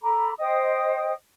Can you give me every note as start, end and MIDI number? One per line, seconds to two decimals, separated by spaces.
0.02 0.32 69
0.02 0.32 82
0.02 0.32 83
0.02 0.32 86
0.38 1.12 72
0.38 1.12 75
0.38 1.12 79
0.38 1.12 87